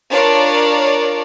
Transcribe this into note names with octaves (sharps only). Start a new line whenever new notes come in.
D4 F4 A#4 C#5 D5